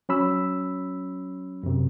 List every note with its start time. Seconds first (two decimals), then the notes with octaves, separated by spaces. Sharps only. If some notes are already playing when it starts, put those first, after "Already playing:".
0.09 F#3 C#4 B5 E6
1.63 F#2 C3